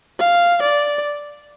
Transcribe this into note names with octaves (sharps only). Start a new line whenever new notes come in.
F5
D5